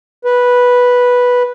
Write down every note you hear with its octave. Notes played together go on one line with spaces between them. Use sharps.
B4